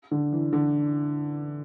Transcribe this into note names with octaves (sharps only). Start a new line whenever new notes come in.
D3
E3
D3